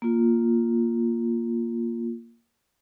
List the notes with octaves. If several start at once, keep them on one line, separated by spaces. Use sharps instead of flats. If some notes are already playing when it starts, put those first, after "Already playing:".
A#3 F4